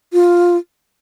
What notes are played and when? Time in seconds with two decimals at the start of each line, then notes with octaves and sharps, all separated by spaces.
0.13 F4